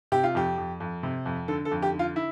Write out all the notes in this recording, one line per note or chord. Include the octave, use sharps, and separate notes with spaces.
C3 G4
F4
F2 G4
F2
F2
C3
F2
D3 A4
A4
F2
G4
D3
F4
E4